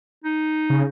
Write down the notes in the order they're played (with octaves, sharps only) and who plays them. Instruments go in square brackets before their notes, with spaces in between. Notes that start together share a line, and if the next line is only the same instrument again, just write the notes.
[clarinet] D#4
[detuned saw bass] C#3